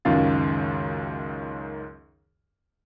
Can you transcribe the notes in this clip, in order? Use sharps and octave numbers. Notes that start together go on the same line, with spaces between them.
C#2 F#2 D#3 F4 F5 A6